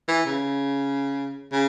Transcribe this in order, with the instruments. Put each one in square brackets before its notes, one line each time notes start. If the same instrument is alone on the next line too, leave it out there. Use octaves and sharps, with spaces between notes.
[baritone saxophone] E3
C#3
C#3